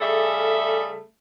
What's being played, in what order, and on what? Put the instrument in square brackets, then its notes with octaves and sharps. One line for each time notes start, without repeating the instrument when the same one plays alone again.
[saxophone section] C#3 G3 A3 G#4 A4 E5